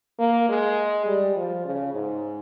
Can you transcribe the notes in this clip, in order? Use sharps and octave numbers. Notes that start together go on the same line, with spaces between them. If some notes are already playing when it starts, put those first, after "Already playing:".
A#3
G#3
G3
F3
C#3
G#2